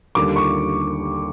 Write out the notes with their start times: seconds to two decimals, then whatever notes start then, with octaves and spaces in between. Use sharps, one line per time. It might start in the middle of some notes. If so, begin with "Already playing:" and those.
0.15 D#2 D3 G3 D6
0.36 C#6